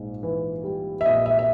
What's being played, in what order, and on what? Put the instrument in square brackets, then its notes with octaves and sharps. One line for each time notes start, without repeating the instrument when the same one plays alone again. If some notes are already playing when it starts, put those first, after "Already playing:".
Already playing: [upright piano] A#1 G#2
E3
G3
E5
A#1 D#5
E5
E5